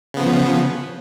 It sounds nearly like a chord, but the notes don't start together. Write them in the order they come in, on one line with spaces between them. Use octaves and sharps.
C#3 B3 F3